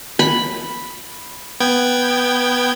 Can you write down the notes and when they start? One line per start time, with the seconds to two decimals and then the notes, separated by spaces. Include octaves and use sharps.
0.19 B5
1.60 B3 G5 G#6